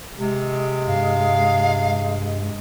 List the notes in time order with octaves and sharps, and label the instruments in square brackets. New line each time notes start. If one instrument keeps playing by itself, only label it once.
[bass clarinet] C3 [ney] G#3
[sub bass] G2 [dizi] F5